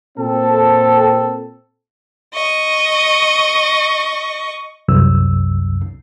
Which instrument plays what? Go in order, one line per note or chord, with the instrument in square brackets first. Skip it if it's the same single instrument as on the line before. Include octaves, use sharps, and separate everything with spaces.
[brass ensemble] A#2 C4 A4
[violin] D#5 C#6
[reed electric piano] C2 F#2 E6